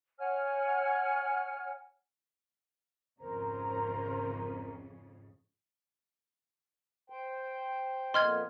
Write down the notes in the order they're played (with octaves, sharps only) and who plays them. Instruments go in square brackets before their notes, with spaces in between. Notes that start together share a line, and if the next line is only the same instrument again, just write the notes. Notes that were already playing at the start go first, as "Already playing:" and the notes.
[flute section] C#5 F#5 G#5 F6
[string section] G#1 F2 C#3 [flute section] A#4 C5 A#5
[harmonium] C5 G5
[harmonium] F2 A#2 B3 [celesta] D#5 [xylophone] C6 F6 G#6